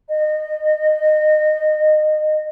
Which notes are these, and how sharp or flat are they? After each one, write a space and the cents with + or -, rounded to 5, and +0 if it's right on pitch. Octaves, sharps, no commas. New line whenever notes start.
D#5 -25